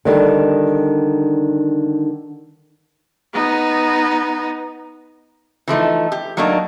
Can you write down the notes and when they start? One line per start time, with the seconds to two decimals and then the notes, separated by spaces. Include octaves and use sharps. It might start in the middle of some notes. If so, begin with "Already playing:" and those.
0.05 D3 D#3 G3
3.33 B3 D#4
5.68 E3 F3 A3 D#4
6.12 G4
6.37 F#3 A3 A#3 D4 D#4